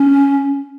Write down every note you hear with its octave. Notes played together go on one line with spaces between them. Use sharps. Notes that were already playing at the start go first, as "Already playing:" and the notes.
Already playing: C#4